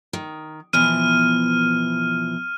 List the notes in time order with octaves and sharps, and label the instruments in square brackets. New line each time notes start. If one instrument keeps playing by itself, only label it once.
[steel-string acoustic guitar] D#3
[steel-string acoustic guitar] B2 E3 F3 [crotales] F6 D#7